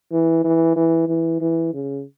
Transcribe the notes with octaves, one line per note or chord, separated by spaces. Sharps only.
E3
E3
E3
E3
E3
C#3